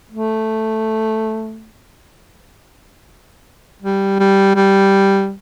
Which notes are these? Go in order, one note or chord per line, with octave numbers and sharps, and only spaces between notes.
A3
G3
G3
G3